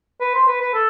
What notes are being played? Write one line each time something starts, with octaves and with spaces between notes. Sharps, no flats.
B4
C5
B4
B4
A4